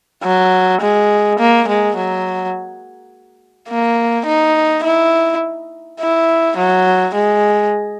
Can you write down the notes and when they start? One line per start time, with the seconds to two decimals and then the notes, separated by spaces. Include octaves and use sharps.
0.23 F#3
0.81 G#3
1.39 A#3
1.68 G#3
1.96 F#3
3.69 A#3
4.26 D#4
4.84 E4
6.00 E4
6.57 F#3
7.15 G#3